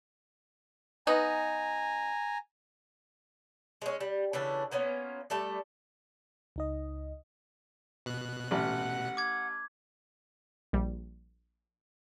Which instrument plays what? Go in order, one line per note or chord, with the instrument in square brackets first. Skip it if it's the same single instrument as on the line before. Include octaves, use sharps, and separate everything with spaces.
[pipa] B3 D#4 [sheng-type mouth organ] G#5 A#5
[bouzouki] G#3 C#4
G3
C#3 E3 D4 A4
A#3 B3 C#4 F4
G3 A3 A4 D5
[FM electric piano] C#2 D#4 D#5
[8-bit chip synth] B2 F#6
[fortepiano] A1 [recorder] F#5
[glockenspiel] D6 G#6
[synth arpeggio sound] A#1 G3